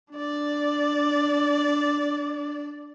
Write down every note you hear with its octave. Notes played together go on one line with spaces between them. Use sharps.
D4 D5